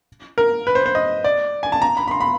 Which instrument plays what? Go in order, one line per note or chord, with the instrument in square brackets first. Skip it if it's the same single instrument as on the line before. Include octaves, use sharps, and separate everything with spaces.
[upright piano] A#4
B4
C5
C5
D#5
D5
G#5
A5
A#5
B5
B5
C6
B5